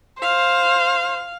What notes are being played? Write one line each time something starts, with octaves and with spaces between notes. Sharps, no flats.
C5 F5